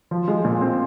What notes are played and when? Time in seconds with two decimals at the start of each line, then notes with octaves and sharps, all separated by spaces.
0.11 F3
0.28 G#3
0.45 A#2
0.61 C4